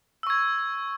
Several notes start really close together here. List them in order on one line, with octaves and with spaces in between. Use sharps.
E6 C#6 G#6